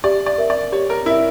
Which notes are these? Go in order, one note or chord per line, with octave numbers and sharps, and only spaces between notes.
G4 D5
D5
A#4 E5
D5
G4 C#5
A#4
E4 A#4 E5